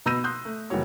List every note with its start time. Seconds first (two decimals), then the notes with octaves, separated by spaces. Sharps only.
0.06 B2 B5 E6 G6 A#6 D#7
0.24 C6 D#6 F#6 G6
0.45 A3
0.70 F#1 E3 G3 F#4 C#5